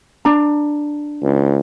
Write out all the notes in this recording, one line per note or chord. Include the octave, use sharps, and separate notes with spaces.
D4 A#5
C#2